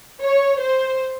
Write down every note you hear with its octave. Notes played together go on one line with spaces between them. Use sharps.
C#5
C5